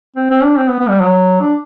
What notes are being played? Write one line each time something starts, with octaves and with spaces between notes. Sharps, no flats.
C4
C4
D4
C4
B3
B3
G3
F#3
D4